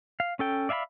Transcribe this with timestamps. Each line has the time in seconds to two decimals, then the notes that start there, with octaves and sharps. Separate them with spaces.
0.20 F5
0.39 C#4 A4 G5
0.69 D5 E5 F5 G#5 B5